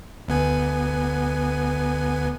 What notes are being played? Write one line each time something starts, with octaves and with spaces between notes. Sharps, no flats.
D2 B3 G#5